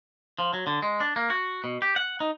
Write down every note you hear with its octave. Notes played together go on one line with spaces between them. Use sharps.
F3
F#3
D3
G#3
D4
A#3
F#4
B2
G4
F#5
D#4